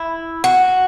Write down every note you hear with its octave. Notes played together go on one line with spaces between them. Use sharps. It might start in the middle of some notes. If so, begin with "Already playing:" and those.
Already playing: E4
F#4